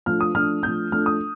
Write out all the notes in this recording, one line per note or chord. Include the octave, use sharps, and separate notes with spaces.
F3 A3 D4 F6
D#6
F3 A3 D4 F6
F3 A3 D4 G6
F3 A3 D4 F6
D#6